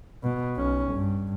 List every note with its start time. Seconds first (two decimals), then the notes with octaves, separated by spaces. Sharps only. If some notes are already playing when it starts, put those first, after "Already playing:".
0.23 B2
0.56 B1 C#4
0.91 G2